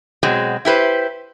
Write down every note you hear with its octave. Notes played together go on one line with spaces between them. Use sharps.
B2 F#3 G#3 C4
E4 G4 B4 C5